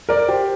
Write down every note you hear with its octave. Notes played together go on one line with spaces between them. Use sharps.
A#4 D5
G4 C5